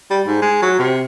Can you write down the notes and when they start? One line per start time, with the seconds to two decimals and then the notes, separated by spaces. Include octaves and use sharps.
0.10 G3
0.27 G#2
0.42 G#3
0.62 F#3
0.79 C3